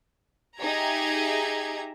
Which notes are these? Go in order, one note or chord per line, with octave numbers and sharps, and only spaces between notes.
D#4 G4 G#4 E5 A#5 G#6